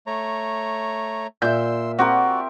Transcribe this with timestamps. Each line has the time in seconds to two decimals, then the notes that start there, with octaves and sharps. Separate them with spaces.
0.07 A3 C#5 A#5
1.42 A#2 E5 C6 E6 G6
1.99 C4 F#4 G4 A#4 D5